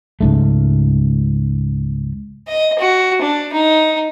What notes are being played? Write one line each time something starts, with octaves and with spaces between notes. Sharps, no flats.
C#2 G#2 A3
D#5
F#4
D4
D#4